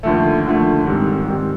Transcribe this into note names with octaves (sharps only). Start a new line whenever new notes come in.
D#2 D3 F3 A3
D#2 D3 F3 A3
G#2 D#3 G3 C4
G#2 D#3 G3 C4